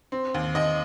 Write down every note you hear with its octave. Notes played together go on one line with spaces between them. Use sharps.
C4
D#2
D#2 D#5